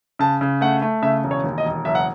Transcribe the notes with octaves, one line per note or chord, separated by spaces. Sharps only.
C#3 A5
C#3
A3 F#5
A3
C#3 E5
E1
C#5
D#2
D#5
E1
F#1 E5
F#5